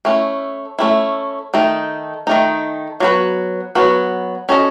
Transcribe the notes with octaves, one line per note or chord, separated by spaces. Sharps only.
A3 C#4 E4
A3 C#4 E4
D#3 A3 D#4
D#3 A3 D#4
F#3 B3 F#4 B4
F#3 B3 F#4 B4
C#4 F#4 A4 D#5